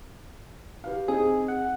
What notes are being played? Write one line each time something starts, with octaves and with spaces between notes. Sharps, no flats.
G4 B4 F5
C4 D#4 G#4
F#5